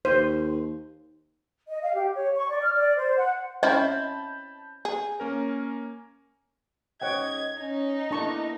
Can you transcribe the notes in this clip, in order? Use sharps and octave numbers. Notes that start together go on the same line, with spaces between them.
D#2 C5
D#5
F5
G4
C#5
C#6
D5
F6
D5
C5
F#5
C4 C#4 E4 D#5 A5 B5 G6
G#4
A#3 C#4 A#4
G#2 C#4 C#5 D#5 F#5 G5 G#6
C#4 D#4
A#3 B3 D4 E4 A5 C#6